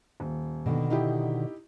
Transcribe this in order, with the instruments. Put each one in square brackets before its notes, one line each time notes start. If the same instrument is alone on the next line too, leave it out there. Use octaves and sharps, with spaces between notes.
[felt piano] D#1
[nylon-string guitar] B2 D3 D#3
[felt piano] D#4 E4 G4